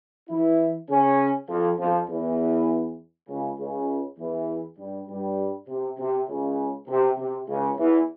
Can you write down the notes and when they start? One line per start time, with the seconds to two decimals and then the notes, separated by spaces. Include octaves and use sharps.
0.28 E3 E4
0.89 C#3 C#4
1.48 F2 F3
1.78 F2 F3
2.08 E2 E3
3.28 C#2 C#3
3.58 C#2 C#3
4.18 E2 E3
4.78 G2 G3
5.08 G2 G3
5.67 C3
5.98 C3
6.27 C#2 C#3
6.87 C3
7.17 C3
7.47 C#2 C#3
7.77 E2 E3